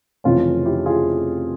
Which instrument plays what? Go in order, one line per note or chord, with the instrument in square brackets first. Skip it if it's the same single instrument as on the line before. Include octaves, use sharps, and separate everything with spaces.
[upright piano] F1 F2 C#3 E3 C#4 F4
E4 G4
F4 G#4